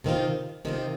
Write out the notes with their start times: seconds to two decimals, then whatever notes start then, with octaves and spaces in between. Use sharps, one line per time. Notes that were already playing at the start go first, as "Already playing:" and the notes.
0.04 C3 D#3 C4 F4
0.65 C3 D#3 C4 F4